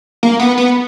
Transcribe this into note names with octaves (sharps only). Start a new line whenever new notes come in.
A#3
B3
B3